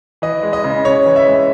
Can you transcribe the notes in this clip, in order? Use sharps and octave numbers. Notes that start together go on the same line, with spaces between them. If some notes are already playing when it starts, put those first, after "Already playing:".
E3 D#5
G#3
D#5
C#3
C#3 C#5
E3
E5
G#3